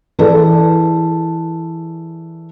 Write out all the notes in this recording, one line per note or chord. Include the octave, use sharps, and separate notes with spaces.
E3 G#4 A4 B4 D5